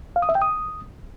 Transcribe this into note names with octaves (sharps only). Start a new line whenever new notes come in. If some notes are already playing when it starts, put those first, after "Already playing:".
F5
D#6
E5
G5
D#6